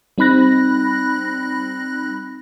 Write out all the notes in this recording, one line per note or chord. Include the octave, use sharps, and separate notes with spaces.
G3 C4 D#4 B5 F#6 A#6